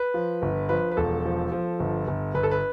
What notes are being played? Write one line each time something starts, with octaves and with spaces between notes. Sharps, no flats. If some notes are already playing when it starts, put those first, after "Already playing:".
Already playing: B4
F3
G1
F3 B4
B4
E1 A4
F3
F3
G1
G1
G1 B4
A4
B4